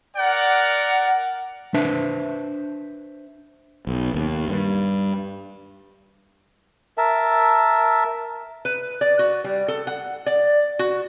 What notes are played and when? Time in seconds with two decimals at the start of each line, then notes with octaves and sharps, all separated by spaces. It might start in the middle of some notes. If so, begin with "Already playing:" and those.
0.17 A#4 D5 F#5
1.74 D4 B4 C5 E5
3.87 B1
4.14 D#2
4.48 G2
6.98 A#4 E5 A5
8.65 B4
9.01 D5
9.19 F#4
9.44 G3
9.68 A4
9.87 F#5
10.26 D5
10.79 F#4